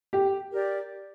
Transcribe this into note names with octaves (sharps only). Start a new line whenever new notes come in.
G4
G4 A#4 D5